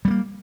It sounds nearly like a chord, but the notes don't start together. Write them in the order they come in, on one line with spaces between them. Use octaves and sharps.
G3 A3 A#3